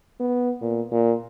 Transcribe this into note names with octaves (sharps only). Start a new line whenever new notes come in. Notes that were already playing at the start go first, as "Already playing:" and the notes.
B3
A#2
A#2